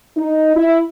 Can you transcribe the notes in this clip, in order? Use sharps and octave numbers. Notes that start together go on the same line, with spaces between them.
D#4
E4